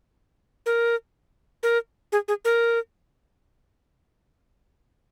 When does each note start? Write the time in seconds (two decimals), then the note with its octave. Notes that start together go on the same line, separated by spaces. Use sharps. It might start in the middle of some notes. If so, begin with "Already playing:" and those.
0.66 A#4
1.63 A#4
2.12 G#4
2.28 G#4
2.45 A#4